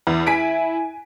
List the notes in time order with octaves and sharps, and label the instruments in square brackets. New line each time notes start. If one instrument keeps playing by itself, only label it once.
[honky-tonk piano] E2 [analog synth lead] E4
[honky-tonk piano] G#5 B6 D7